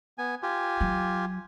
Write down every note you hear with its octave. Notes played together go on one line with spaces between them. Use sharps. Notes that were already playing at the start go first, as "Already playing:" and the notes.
B3 G#5
F4 G4 G#5
F#3